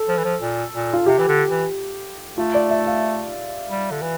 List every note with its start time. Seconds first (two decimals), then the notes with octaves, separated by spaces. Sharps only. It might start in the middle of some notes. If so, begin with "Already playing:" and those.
Already playing: A4
0.08 F3
0.17 E3
0.24 F3
0.41 A#2
0.74 A#2
0.93 F4
1.06 C3 G4
1.18 E3
1.28 D3
1.50 E3
2.38 A3 F4
2.54 D5
2.71 E5
2.87 F5
3.69 G3
3.91 D3
4.02 E3